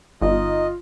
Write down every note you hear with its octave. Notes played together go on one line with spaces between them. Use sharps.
G1 D#4 F4 D#5